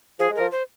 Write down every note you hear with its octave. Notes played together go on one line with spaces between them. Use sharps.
F3 G#4
G#3
F3 A#4
C5